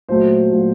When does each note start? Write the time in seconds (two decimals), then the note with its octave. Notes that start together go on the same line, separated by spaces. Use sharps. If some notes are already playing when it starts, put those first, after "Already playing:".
0.08 A#2 F#3 A3 C5
0.52 A#2 F#3 A3